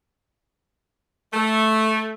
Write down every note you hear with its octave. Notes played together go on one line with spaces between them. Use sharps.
A3